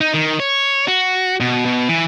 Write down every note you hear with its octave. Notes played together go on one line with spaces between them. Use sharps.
D#4
D#3
C#5
F#4
B2
B2
E3